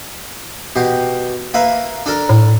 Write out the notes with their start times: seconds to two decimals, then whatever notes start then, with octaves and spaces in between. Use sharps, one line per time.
0.76 B2 G4
1.54 A#3 B4 E5
2.06 D4 A4 A#4
2.29 A2